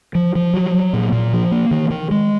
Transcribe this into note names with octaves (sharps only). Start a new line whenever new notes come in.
F3
F3
F#3
F#3
A#2
A#2
F3
A#3
D#3
D#3
G#3